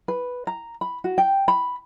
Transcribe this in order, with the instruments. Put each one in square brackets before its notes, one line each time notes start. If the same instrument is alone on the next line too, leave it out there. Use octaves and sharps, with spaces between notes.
[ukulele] B4
A#5
B5
F#4
G5
B5